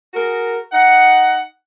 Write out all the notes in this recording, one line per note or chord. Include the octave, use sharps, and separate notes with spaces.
F#4 G#4 A#4
D#4 F#5